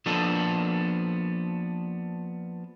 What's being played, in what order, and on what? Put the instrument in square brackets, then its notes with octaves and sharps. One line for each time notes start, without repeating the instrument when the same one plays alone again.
[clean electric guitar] F3 A#3 B3 D4 A4